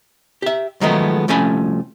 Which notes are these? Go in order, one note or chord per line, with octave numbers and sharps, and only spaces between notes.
G4 E5
D#3 F3 F#3 G#3 A3 B3
C2 F3 A3 C#4 G#5 B5